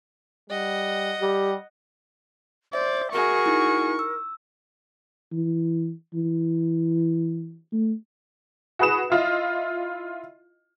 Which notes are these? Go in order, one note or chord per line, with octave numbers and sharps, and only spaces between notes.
G3 D#5 F#5
G3 G4
C5 D5 E5
F#4 G#4 A#4 C#6
D#4 E4
E6
E3
E3
A3
F#4 G#4 B4 D#6 E7
E4 F4 D#5